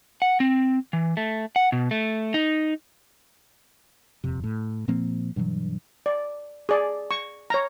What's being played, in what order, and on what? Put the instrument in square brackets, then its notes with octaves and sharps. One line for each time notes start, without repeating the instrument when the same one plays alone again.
[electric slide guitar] F#5
C4
E3
A3
F#5
B2
A3
D#4
[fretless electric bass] D#1 F2 C3
A2
A#2 F3 A#3 C4
G2 B2 E3 F#3
[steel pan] D5
G#4 D5
C#6
C#5 A#5